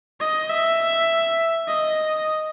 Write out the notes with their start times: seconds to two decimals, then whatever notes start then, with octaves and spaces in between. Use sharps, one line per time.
0.20 D#5
0.50 E5
1.68 D#5